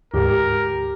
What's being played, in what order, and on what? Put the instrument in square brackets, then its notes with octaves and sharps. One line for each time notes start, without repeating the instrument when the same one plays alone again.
[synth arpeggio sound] D2 G#2 [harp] G4 [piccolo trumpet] A#4